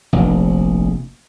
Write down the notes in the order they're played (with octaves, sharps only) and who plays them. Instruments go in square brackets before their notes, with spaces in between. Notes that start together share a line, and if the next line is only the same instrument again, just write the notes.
[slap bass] F1 A#1